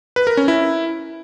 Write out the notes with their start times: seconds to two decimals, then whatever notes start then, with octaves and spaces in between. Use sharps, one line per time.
0.16 B4
0.27 A#4
0.37 C#4
0.48 E4